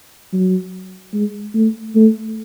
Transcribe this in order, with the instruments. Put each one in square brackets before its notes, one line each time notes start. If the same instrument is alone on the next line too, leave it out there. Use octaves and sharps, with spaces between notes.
[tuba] F#3
G#3
A3
A3